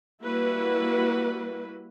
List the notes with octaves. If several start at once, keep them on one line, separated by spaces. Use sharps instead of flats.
G3 A#3 E4 F#4 B4